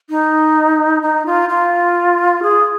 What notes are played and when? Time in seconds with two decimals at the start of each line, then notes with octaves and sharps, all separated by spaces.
0.10 D#4
1.02 D#4
1.26 F4
1.49 F4
2.43 G#4